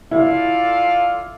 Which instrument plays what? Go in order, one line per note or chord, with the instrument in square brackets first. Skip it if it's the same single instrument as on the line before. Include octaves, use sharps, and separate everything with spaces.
[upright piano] E4 [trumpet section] F4 A4 D5 F5